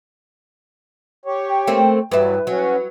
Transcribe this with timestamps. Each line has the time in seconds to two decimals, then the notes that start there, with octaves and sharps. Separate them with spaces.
1.25 G4 C#5
1.48 G5
1.67 A3 A#3 C4
2.12 G2 E3 F#3 G3 E4 B4
2.47 F#3 C#4 F#4